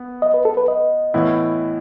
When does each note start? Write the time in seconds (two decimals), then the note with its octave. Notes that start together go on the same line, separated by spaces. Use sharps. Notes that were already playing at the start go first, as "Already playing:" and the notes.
Already playing: B3
0.22 D#5
0.34 B4
0.45 A4
0.57 B4
0.68 D#5
1.14 A2 E3 B3 E4